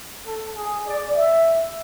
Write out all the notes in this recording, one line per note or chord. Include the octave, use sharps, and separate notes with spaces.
A4
G#4
D5
E5